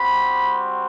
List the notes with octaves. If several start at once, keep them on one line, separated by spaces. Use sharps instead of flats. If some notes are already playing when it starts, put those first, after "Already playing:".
Already playing: G3 C4 F#4 B5